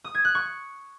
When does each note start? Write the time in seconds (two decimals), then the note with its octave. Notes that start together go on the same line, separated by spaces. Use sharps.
0.04 D#6
0.15 G#6
0.25 F#6
0.35 C#6